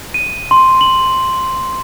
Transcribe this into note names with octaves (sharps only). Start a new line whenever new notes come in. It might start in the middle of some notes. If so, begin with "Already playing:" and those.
D#7
C6
F#7